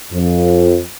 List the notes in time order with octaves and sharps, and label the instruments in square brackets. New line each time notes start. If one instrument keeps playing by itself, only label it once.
[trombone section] F2